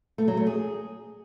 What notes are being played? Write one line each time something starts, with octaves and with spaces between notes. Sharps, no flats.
A3
F#3
A3
G#4